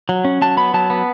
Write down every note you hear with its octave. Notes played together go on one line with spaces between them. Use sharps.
F#3
C#4
F#3 A5
B3 B5
F#3 A5
B3